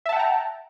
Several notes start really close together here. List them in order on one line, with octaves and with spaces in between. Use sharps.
E5 A5 F#5 G5 A#5